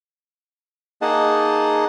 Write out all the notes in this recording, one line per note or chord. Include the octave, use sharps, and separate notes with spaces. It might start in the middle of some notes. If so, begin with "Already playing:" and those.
A#3 D#4 G#4 D#5 F#5 A5